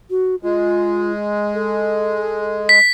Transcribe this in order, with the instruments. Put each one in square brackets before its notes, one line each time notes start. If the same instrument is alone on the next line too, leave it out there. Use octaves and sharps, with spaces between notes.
[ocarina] F#4
[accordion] G#3 [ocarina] F4
[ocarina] A4
[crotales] B6